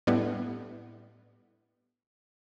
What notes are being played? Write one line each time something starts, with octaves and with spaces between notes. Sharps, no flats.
A2 G3 B3 D4 E4